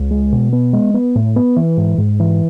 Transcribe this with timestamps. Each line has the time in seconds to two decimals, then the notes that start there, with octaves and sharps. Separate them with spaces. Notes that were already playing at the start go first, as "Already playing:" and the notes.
Already playing: C#2
0.11 G#3
0.32 B2
0.53 B3
0.73 G#3
0.94 B3
1.15 A2
1.36 B3
1.56 E3
1.77 G#2
1.98 G#2
2.20 E3